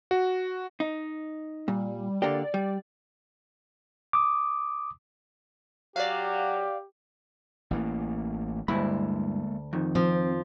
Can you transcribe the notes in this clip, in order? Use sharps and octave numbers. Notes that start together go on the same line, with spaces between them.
F#4
D#4
A#2 G3
D3 A#3 G4 D5
G3
D6 D#6
F#3 G4 D5 F5
A1 E3 A#3
D2 G2 G#3 A#3 E4 B5
F2 D#3
F3 C4